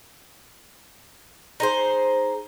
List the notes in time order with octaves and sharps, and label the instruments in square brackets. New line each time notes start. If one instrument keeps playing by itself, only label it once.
[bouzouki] D#4 G#4 C5